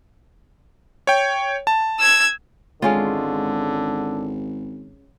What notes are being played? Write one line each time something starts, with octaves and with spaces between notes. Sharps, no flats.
C#5 G5
A5
E6 G#6
G#1 D3 G#3 C#4 F4